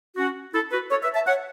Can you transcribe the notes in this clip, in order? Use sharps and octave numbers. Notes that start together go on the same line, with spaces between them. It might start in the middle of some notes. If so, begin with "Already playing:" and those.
C#4 F#4
E4 A4
F#4 B4
A4 C#5
B4 E5
E5 A5
C#5 F#5